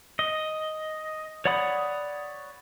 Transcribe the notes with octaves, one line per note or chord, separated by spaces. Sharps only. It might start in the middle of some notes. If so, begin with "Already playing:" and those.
D#5
C#5 D5 F#5 B5 D#6